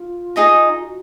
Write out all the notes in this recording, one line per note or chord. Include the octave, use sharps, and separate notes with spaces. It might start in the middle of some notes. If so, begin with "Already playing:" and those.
Already playing: F4
D#4 G#4 D#5 A#5
F#4